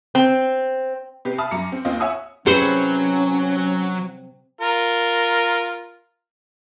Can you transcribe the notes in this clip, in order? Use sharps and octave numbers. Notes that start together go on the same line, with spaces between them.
C4
C3 G4 B4 C7
E5 A5 B5 D#6 F6
F#2 A#5 D6 C#7
C4
D#2 C4 F4 D#5
C#5 E5 F#5 G#5 D#6 E6
C3 F#3 C#4 E4 G#4 B4 C5 F#5
F4 A#4